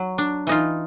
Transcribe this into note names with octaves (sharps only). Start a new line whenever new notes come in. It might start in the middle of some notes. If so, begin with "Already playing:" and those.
Already playing: F#3
D4
E3 D#4 F4